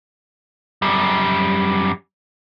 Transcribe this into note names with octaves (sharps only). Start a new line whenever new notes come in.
F#2 G3